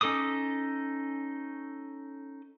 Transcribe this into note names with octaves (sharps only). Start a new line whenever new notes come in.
C#4 D#4 A4 D6 D#6